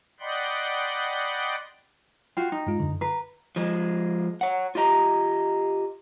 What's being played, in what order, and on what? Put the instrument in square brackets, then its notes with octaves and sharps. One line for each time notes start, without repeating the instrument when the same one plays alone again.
[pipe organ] D5 D#5 F#5 G5 B5 C6
[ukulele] F4 F#4 [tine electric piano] G5
[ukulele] D#4
[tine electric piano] G2 G#3 F4
F#2 D3
[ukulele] B4 [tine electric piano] A#5
[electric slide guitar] F3 G#3
C#5 F#5
F4 G4 D#5 A#5